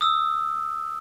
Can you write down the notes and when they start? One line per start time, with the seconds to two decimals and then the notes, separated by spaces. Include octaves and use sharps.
0.01 D#6 E6